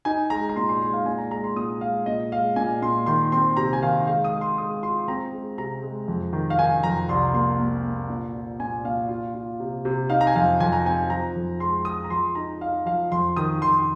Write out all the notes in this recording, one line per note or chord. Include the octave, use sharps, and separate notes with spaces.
D#4 G#5
G#3 A#5
A#5
A#2 C6
C6
G#3 C6
F5
A#2 G#5
A#5
G#3 A#5
C6
A#2 D#6
G#3 F5
A#2 D#5
G#3 F5
A#2 G#5
A#2 C6
D#3 C6
C4 C6
C3 A#5
G#5
D#3 F5
G#3 F5
D#6
G#3
C6
G#3 D#6
F4 C6
C4 A#5
G#3
C3 A#5
G#3
F2
D#3
F5
D#3 G#5
F2 A#5
C2 C6
A#3 C6
A#3
A#3
A#2
F4
A#2 G#5
A#2 F5
F4
F4
C3
C3
D#4 F5
A#5
G#5
F2 F5
F2 G#5
A#5
C4 G#5
F3 A#5
F2
G#3 C6
G#3 D#6
A#5
F3 C6
D#4 A#5
D#4 F5
F3 F5
F2 C6
D#3 D#6
D#3 C6